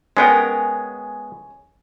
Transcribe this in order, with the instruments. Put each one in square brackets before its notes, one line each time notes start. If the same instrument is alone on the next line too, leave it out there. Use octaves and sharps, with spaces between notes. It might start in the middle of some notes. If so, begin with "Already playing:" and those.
[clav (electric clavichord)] G#3 B3 G5 [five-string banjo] C#4 A#4